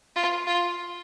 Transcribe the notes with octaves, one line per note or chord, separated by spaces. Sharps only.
F4
F4